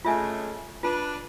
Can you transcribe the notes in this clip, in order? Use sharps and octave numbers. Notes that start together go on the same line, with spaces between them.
C#3 G#3 A3 F4 E5 G#5
D4 F4 B4